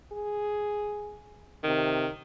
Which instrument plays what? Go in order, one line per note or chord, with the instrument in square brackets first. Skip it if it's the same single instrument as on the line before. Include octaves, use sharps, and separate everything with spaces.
[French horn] G#4
[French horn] C3 [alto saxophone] D#3